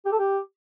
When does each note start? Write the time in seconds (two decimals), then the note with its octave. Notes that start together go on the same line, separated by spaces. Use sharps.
0.05 G4
0.12 A4
0.19 G4